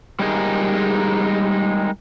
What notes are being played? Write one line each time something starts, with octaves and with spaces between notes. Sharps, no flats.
G3 G#3 D#4 G#4 A#4